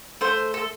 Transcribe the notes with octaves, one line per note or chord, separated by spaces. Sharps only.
A3 C5
A4